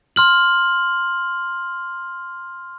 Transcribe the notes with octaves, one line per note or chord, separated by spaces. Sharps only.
C6 F6 F#7